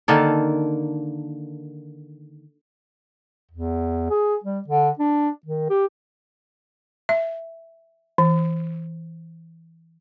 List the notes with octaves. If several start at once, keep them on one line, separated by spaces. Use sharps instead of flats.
D3 D#3 A#3 A4
E2
G#4
G3
D3
D4
D#3
G4
E5
E3